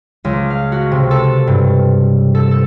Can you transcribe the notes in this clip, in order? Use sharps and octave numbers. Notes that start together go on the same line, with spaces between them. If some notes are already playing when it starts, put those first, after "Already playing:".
C#2
F5
F#4
C3
A4
G2
A4
A4